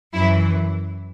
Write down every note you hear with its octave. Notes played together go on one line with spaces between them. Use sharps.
F#2 E3 E4